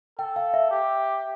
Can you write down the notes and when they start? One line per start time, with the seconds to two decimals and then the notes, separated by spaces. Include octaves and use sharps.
0.18 A4 G5
0.36 F5
0.54 E5
0.71 G4